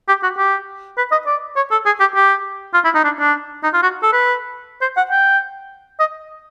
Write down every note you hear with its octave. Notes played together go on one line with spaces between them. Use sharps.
G4
F#4
G4
B4
D#5
D5
C#5
A4
G#4
G4
G4
F4
E4
D#4
D4
D4
D#4
F4
F#4
A4
B4
C5
F#5
G5
D#5